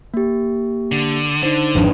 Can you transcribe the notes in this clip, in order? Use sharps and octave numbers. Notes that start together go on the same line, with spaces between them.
A#3 G4
D3
D3 D#4 C5
G#1 F2 D4 B4